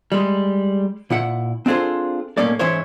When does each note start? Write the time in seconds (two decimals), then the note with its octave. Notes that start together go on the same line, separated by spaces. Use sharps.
0.12 G3 G#3
1.10 A#2 E4 F#5
1.66 C4 D4 F4 G#4 A4 C5
2.37 B1 A2 A#3 C#4 D5
2.59 G#2 E3 C#4 E4 C5 C#5